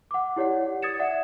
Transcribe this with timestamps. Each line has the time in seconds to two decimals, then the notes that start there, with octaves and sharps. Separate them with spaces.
0.11 F#5 D6
0.36 E4 G4 C#5 D5 F#5
0.82 D#6 G#6 A6 C#7 E7
0.99 D5 E5 F#5